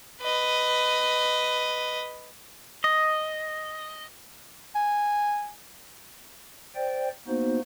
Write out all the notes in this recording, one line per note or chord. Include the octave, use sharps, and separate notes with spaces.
B4 D#5
D#5
G#5
C5 D5 G5
A#3 B3 D#4 F#4 C5